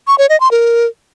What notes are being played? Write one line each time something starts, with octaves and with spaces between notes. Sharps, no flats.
C#6
C#5
D#5
C6
A#4